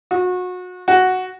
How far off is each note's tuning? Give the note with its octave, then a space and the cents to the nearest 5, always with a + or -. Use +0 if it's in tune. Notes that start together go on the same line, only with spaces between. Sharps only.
F#4 -30
F#4 +0